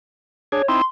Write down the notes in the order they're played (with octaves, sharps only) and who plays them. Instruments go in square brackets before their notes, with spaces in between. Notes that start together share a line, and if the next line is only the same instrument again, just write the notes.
[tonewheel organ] D4 G#4 [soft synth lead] C#5
[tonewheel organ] C4 D#4 E4 [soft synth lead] C6